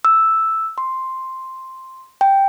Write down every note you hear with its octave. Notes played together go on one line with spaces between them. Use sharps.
E6
C6
G5